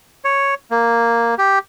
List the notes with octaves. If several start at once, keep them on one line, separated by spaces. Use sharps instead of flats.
C#5
A#3
G4